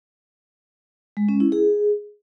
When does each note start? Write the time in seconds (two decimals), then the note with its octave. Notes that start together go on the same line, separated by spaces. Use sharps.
1.17 G#3
1.29 C#4
1.40 E4
1.52 G#4